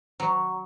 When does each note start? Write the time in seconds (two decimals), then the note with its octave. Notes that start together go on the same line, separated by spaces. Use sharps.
0.20 F#3